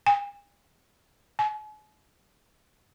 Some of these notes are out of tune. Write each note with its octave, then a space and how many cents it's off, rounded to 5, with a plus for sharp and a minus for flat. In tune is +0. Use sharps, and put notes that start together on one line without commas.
G#5 -45
G#5 +45